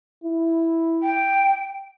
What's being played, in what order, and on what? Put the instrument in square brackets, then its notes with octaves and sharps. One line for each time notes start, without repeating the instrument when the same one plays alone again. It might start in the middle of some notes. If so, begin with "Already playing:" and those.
[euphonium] E4
[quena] G5